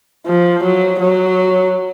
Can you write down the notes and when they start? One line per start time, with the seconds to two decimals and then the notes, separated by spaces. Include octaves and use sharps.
0.27 F3
0.64 F#3
1.00 F#3